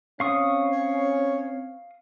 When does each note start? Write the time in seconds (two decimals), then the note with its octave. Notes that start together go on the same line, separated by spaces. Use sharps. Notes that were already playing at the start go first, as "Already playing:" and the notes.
0.20 C4 C#4 F5 C#6 D#6
0.72 C#5